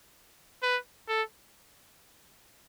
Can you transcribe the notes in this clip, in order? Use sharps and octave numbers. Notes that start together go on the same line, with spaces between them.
B4
A4